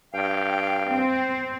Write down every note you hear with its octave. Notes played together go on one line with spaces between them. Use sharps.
G2 F5 G5
C4 C5